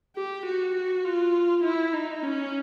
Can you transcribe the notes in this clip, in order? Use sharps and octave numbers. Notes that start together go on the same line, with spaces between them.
G4
F#4
F#4
F4
E4
D#4
C#4